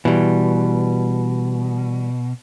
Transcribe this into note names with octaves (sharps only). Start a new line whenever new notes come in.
B2 E3 G3